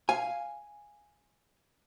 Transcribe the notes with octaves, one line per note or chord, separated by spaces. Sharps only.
F5 G#5